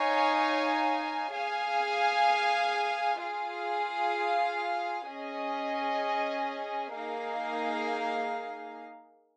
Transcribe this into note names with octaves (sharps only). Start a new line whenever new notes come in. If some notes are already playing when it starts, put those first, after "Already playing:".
Already playing: D#4 C#5 F5 G#5
G#4 F5 G#5
F4 G#4 F5
C#4 G#4 D#5 G#5
A#3 D#4 G#4 F5